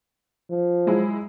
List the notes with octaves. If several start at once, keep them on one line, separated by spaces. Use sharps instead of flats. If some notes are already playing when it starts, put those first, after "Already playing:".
F3
F#3 G#3 E4